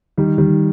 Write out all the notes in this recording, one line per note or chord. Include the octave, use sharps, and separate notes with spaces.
D#3 G3
D#3 G3